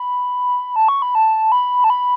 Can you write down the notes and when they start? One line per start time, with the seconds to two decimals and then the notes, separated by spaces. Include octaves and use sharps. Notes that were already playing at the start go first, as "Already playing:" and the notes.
Already playing: B5
0.76 A5
0.88 C#6
1.02 B5
1.15 A5
1.52 B5
1.84 A5
1.90 B5